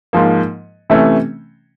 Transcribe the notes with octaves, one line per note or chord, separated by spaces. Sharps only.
G#2 F3 A#3
C3 E3 A3 C#4